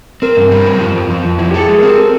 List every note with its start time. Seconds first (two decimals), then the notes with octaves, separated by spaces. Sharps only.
0.22 C4 A#4
0.37 G2
0.51 G3
0.66 C4
0.80 F3
0.95 F2
1.10 F3
1.25 F2
1.39 E4
1.51 G4
1.54 G#4 A4
1.69 G#3
1.79 C4 A#4
1.97 A4